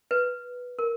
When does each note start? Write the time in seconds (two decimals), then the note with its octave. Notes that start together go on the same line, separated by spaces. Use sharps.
0.11 B4
0.79 A#4